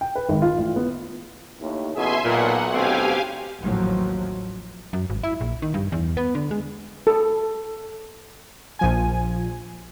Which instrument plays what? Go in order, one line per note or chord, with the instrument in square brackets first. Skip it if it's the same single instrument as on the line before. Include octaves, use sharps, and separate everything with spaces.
[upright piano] G5
B4
G#1
F4
A1
B3
[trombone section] D#2 A2
[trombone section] A1 B2 G#4 [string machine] E5 G#5 C6
[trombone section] B1 [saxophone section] A#2 [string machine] F#5
[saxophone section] D2 B2 C4 [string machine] G4 F5 G#5
[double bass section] A1 D#2 A2 F3 F#3
[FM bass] F#2
G#1
E4
A#1
D#3
G2
E2
B3
D3
G#3
[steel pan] A4
[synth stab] A#1 F3 G#5